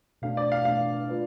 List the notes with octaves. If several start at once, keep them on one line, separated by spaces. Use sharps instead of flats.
B2 A3 D4 F5
D5
F5
B2 A3 D4 F5
A3 F4 B4 D5